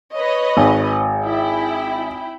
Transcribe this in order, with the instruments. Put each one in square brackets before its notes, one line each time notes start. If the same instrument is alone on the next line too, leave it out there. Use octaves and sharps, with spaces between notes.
[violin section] B4 C#5 D#5
[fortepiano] G#1
[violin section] E4 G5